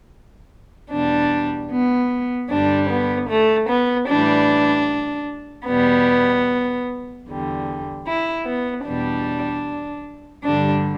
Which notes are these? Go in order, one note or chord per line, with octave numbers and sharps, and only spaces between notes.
E2 B2 G3 D4
B3
G2 D3 G3 D4
B3
A3
B3
A2 E3 G3 D4
E2 B2 G3 B3
E2 D3 G3
E4
B3
E2 B2 G3 D4
G2 D3 G3 D4